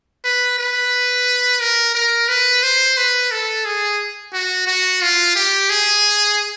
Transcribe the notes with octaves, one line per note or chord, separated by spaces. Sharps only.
B4
B4
A#4
A#4
B4
C5
B4
A4
G#4
F#4
F#4
F4
G4
G#4